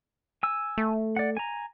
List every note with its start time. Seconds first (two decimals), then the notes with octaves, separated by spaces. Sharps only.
0.43 G#5 E6
0.78 A3
1.16 D5 F#5
1.37 G#5 A#5